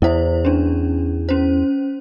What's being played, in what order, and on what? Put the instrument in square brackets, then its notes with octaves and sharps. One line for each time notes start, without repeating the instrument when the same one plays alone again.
[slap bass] E2 [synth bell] E4 C5
[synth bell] C#4 D4
C#4 C5